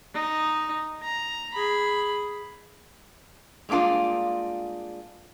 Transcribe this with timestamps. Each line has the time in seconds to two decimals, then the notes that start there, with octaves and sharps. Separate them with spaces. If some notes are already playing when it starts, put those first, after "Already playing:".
0.13 D#4
1.02 A#5
1.54 G#4 B5
3.69 G3 G#3 A#3 D4 F4